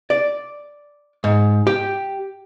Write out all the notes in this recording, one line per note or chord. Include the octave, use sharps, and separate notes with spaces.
D5
G#2
G4